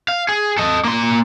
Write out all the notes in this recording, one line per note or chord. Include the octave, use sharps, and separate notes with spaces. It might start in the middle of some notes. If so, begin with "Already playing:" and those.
F5
G#4
A4 D#5
A#3 C6